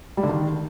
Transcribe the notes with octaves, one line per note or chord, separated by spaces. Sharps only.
G3
D3
D#3